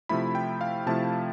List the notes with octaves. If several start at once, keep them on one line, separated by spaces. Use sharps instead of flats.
C3 F3 A3 E4 B5
G5
F5
C3 F3 A3 E4 A5